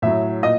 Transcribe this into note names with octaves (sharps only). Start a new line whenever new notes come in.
A2 F#3 E5
A#2 D#5